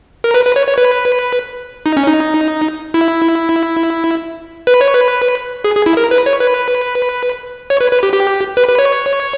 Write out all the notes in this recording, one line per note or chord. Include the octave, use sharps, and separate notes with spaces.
A#4
B4
B4
C#5
C#5
B4
D#4
C#4
D#4
E4
B4
C#5
B4
G#4
G#4
E4
A#4
B4
C#5
B4
C#5
B4
B4
G4
G4
B4
B4
C#5